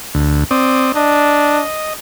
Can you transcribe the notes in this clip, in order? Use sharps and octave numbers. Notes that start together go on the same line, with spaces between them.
D2
C4 D5 D#6
D4 D#5